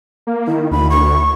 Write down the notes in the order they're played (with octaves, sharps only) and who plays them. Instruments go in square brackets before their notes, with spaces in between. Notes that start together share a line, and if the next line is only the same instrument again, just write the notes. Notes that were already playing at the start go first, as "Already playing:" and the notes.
[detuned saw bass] A#3
[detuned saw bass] D#3 [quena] E4
[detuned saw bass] D2 [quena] B5
[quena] C#6